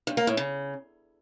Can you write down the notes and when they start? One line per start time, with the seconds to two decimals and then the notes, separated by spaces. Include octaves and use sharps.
0.07 G2
0.17 A#3
0.27 A2
0.37 C#3